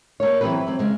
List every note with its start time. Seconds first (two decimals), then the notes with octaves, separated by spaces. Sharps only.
0.20 A#3 C#5
0.41 E3 F#3 A#3 C4 G4 B4
0.67 F#3 C4
0.79 C#3 G#3